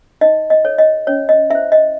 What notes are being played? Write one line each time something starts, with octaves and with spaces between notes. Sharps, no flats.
D#4 D#5
D#5
A4 C#5
D#5
C#4 C#5
D#5
E4 C5 E5
D#5